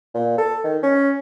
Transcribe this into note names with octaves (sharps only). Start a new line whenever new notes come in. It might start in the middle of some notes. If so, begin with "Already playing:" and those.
A#2
A4
D#3
C#4